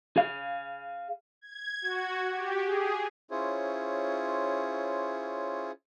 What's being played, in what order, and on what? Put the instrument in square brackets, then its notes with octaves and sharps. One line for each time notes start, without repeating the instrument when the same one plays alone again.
[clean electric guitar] G#4 F5
[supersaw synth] G#6
F#4
G4
G#4
[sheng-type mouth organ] C#4 E4 F4 G#4 C5 C#5